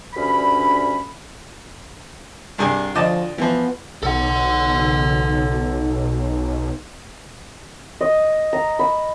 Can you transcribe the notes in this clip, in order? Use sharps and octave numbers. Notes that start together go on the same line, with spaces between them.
D2 G2 C#4 B5
C2 G2 G#4
D2 F3 D#5 A5
E3 F3 B3
B1 A4 F#5
D#5
A#5
B5